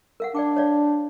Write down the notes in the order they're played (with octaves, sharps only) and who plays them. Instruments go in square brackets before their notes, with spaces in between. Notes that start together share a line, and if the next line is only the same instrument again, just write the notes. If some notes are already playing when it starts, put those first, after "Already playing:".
[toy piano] A#4 F5 F#5
[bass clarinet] D4 [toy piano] D5 G5 D6
[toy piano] C#5 D5 F5